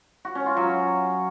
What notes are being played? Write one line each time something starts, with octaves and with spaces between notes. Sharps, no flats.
F#4
C#4
F4
F#3